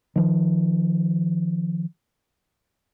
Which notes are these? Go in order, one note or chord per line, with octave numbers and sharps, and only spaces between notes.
D#3 F3